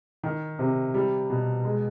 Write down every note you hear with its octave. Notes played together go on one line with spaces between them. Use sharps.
D#3
C3
G3
B2
G#3